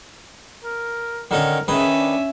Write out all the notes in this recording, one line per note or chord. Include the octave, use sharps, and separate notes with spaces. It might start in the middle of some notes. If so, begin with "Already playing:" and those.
A#4
D3 D#3 C#4 A#4
D#3 C#4 G#4 B4 E5
D4